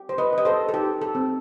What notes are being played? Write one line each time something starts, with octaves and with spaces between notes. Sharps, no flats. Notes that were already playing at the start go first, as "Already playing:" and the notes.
Already playing: G4
C5
B4 D#5
G4 D#5
A4 C5
A4
D#4 G4
A4
C4